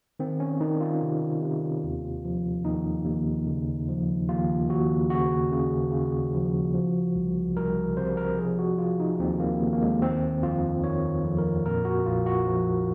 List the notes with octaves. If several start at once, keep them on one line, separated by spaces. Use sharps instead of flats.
D#3 C4
C#4
D#3 D#4
F4
C3
C3
D#2
F3
D#2 D#4
D#2
C#3
F3
D#2 F4
D#2 F#4
C#3 F#4
C#3
C#3
F3
F3
C2
C2 A#4
C3 C5
A#4
F3 G#4
F#4
F3 F4
D#4
D#2 C4
A#3
D#2
A#3
G#3
D#3 C4
F2 F4
D#3 C#5
F2
A#4
A#2 A#4
F#4
A#1 F4
F#4
F3